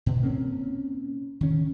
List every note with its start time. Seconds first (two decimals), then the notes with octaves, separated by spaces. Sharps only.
0.06 B2
0.23 A#3 C4 C#4
1.41 D#3 C#4